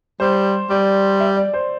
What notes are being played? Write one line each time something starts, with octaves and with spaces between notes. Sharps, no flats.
G3 C5
G3 D5
E5
D5
C5